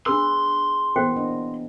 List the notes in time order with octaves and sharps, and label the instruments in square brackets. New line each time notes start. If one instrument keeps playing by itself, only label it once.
[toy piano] D4 E6 [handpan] G#4 B4 [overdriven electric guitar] C6
[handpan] E3 A#3 B3 [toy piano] F#4 C5 G5
[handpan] D4 D#5